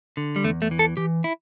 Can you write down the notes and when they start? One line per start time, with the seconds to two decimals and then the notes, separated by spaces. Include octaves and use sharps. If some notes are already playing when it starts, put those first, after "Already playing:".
0.17 D3
0.36 G3
0.44 E2 A3
0.62 A3
0.71 E3
0.79 A4
0.97 E3 G4
1.24 E4